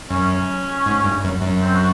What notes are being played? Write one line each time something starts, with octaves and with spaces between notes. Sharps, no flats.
F#2 C#4
G#2
G2
F#2
F#2
C4
F#4